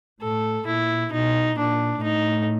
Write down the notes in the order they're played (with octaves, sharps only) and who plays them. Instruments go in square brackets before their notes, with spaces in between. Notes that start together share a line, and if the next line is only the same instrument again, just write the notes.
[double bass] A2 [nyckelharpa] A4
[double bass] A#2 [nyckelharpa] E4
[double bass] B2 [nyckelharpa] D#4
[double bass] A#2 [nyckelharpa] D4
[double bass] A2 [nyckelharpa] D#4